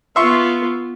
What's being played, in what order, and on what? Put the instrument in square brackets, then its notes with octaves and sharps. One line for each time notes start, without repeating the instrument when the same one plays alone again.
[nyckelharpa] B3 F4 [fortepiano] E5 C6 C#6